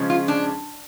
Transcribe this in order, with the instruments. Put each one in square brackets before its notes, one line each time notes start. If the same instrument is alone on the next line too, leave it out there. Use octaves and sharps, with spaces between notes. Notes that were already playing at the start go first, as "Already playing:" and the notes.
Already playing: [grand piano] C#3 F3 G#3 C#4
[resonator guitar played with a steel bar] F4
D4